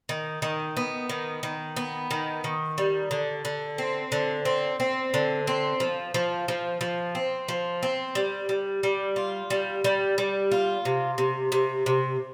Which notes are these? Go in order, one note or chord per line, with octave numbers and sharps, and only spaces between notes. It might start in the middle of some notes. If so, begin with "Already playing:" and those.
D#3
D#3
B3
D#3
D#3
B3
D#3
D#3
G3
D3
D3
C4
D3
C4
C4
D3
C4
F3
F3
F3
F3
C4
F3
C4
G3
G3
G3
F4
G3
G3
G3
F4
C3
C3
C3
C3